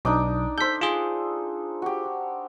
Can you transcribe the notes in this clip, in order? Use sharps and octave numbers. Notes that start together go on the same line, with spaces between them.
B1 D4 D#4 D6
A4 C5 G6 B6
F4 G#4
F#4 G4